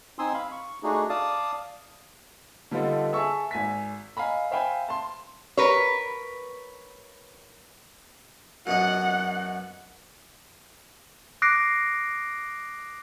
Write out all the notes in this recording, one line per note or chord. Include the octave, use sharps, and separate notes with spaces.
C4 D#4 G#5 C6 D#6 E6
F5 B5
C#6
A3 D4 D#4 F#4 G#4
D5 F5 A5 D#6
D3 G3 B3 D#4 F4 A4
G#4 E5 A5 C#6 E6
G#1 G#5 B6
D#5 F5 G#5 A#5 B5
C5 E5 F5 G5 G#5 B5
A5 C6
A#4 B4 C#5
F#2 B2 D#5 F#5
D6 D#6 F#6 A#6 C7 D7